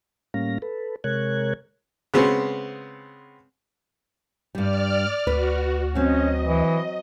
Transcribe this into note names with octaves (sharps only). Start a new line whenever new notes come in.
A2 G3 A#3 C#4 F5 A#6
A4 B4
C3 G#3 A#4 C#5 F#6 G#6
C#3 G#3 B3 C4
G2 G3 D5 F6
D2 F#4 B4
F#3 C4 C#4 D#5
E3